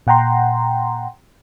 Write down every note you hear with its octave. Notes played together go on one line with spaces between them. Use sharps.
A#2 F#5 G5 A#5 C6